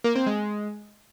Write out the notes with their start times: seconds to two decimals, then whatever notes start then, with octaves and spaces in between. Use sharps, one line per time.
0.04 A#3
0.15 C4
0.26 G#3